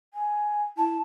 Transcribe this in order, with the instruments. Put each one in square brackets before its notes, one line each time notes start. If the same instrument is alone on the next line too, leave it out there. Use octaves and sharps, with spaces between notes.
[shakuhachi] G#5
[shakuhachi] E4 [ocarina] A5